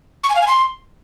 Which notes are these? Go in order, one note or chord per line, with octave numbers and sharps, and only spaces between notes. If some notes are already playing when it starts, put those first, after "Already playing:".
C#6
G#5
F5
G#5
C6